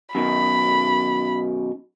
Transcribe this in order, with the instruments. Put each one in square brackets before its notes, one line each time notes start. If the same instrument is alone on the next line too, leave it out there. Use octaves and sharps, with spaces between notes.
[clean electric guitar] F#2 B2 D#3 [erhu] B5